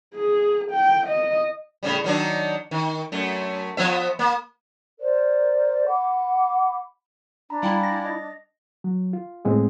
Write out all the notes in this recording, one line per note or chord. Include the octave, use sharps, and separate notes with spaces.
G#4
G5
D#5
A2 C#3 G3
D#3 F#3 D4
D#3
F#2 A3
F3 B3 E5
A#3
A#4 C5 D5
F#5 B5 D6
D4 A#5 B5
G3 E4 F5 G5 G#5
A#6
D#5
F#3
F4
A2 G#3 B3 C4